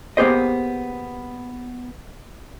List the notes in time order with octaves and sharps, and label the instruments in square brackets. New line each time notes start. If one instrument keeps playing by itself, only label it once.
[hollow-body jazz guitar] A#3 B3 G4 G#4 C5 D#5